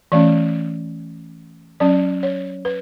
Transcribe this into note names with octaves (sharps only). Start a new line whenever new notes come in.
E3 A3 C#4 D5
F#3 C#4 D5
C#5
B4